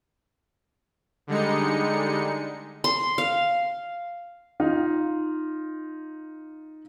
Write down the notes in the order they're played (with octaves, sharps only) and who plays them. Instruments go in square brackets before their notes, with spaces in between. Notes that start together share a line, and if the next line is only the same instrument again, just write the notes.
[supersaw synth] D3 G3 G#3 D#4 C#7
[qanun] C6
F5
[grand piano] D#4 F4 F5